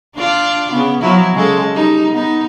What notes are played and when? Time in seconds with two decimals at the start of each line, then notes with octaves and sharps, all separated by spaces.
0.16 D4 F4 D5
0.72 C#3 B3
1.01 F3 F#3 E4
1.33 C#3 G#3 A4
1.73 G3 D#4
2.11 B3 D#4